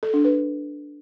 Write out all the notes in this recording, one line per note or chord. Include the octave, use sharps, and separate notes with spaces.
A4
D4
B4